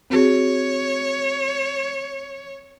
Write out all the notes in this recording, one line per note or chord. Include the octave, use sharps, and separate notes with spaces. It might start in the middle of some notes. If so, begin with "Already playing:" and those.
C4 F#4 G#4 C#5